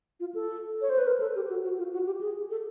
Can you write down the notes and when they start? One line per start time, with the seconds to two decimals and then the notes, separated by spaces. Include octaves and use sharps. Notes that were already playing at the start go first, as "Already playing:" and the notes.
0.20 F4
0.34 A4
0.82 C#5
0.90 C5
0.98 B4
1.07 A#4
1.20 A4
1.35 G4
1.49 F#4
1.64 F#4
1.78 F4
1.93 F#4
2.06 G4
2.21 G#4
2.50 A4